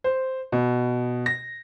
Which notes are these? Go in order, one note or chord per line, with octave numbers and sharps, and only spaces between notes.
C5
B2
A#6